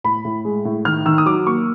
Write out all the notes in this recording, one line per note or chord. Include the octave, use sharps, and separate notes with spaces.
A2 B5
A2
G#3
A2
D#3 F6
D#3 E6
D#6
F#3 D6
A#3 C#6